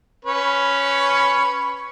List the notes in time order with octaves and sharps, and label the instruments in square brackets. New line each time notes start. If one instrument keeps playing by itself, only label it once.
[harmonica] C#4 B4 C#5